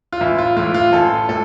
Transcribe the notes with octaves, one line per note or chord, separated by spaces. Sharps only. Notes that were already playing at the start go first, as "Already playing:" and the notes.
F4
A1 E4
F4
A2 E3 F4
F4
A1 A4
A2 A4